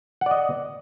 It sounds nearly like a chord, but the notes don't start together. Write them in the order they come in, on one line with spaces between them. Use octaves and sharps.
F#5 D5 D#5